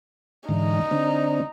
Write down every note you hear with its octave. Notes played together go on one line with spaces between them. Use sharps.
G#2 D3 E3 D#4
D3 C4 D4